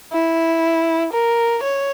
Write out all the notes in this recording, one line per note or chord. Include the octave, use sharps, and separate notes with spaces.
E4
A#4
C#5